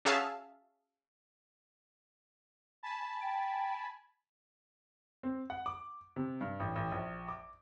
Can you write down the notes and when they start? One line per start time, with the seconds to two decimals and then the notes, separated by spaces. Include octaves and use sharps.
0.05 C#4 F#4 G#4 E5 F5 A5
2.83 G#5 A5 B5
3.22 G5
5.23 C4
5.50 F#5
5.66 D6
6.16 C3
6.41 G2
6.60 A1
6.76 A1
6.92 A#1
7.28 D6